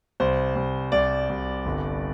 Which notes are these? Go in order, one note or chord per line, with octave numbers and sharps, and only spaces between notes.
C2 C5
C2
C2 D5
C2
G1